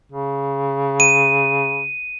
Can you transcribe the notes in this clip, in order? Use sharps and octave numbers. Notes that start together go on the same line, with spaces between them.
C#3
D#7